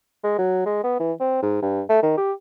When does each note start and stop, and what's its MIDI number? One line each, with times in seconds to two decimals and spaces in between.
0.24 0.37 56
0.38 0.63 54
0.65 0.80 56
0.83 0.94 59
1.00 1.12 52
1.20 1.42 60
1.42 1.59 44
1.62 1.81 43
1.89 2.02 57
2.03 2.12 51
2.17 2.32 67